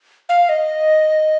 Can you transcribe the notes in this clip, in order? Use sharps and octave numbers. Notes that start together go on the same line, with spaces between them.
F5
D#5